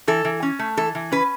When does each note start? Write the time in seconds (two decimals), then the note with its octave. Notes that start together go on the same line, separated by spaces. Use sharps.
0.08 E3 A4
0.25 E3
0.43 C#4
0.59 A3
0.77 E3 A4
0.95 E3
1.12 C#4 B4